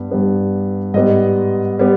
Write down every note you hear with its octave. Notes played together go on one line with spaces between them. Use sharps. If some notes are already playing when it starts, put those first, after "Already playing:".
Already playing: G2 G3 B3
G2 G3 B3
G#2 G3 B3 D#5
G3 B3